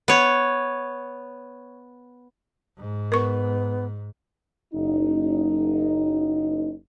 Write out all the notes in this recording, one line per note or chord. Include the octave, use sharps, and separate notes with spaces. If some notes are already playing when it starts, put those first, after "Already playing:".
B3 C#5
G#2
B3 A#4 C#6
F#1 D#4